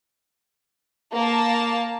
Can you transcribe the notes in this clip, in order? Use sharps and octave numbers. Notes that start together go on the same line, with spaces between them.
A#3 A5